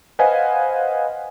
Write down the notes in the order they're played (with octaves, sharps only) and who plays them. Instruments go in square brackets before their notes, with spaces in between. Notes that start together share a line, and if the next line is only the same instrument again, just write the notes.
[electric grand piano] B4 C5 D#5 F5 F#5 G#5